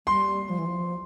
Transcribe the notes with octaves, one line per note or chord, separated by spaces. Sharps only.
G3 C6
F3
E3
F3